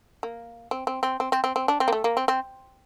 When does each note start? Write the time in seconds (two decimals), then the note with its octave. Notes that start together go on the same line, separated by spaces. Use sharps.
0.23 A#3
0.71 C4
0.87 C4
1.03 C4
1.20 C4
1.32 C4
1.44 C4
1.56 C4
1.68 D4
1.80 C4
1.88 A#3
1.93 A3
2.04 A#3
2.17 C4
2.28 C4